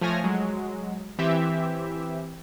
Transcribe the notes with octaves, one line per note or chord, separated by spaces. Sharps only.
F3 A3 C#5 G#5 F6 A#6
F#3 G#3
E3 C4 G4 E5